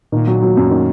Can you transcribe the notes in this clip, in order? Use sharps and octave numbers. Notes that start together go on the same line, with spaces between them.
A#2 D#3
F#3
F#3
F#2
D#3